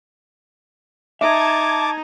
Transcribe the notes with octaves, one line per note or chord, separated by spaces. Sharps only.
D#4 E5 A5 D6 G#6